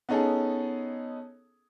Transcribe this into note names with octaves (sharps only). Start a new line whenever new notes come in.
B3 C#4 D#4 G#4 A4